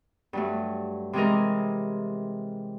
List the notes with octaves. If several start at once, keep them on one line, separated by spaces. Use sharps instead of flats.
G2 F#3 A3
C3 E3 G#3 G#4 A#4